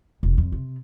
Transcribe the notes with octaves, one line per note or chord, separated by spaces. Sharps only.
F1
F2
C3